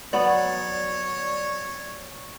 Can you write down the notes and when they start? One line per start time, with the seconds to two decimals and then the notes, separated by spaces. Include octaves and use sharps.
0.13 F#3 B3 C#5 D5